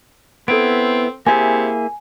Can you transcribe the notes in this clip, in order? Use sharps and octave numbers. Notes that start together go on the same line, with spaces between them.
B3 C4 E4 A4 D7
C3 A#3 E4 G#4 G#5